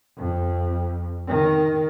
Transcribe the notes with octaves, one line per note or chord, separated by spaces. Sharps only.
F2
D#3